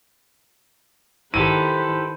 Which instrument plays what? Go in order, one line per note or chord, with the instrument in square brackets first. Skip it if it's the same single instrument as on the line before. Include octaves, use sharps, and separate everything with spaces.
[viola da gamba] D#3 B4 [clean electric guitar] E4 G4 A4 [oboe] C5 [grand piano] D#7